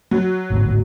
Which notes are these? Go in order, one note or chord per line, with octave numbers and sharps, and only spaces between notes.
F#3
G#1 D2 A2